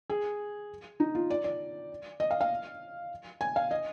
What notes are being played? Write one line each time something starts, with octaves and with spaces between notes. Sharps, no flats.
G#4
D#4
F4
D5
D5
D#5
F5
F5
G#5
F5
D#5